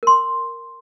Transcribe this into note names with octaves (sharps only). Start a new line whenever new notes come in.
A#4 C6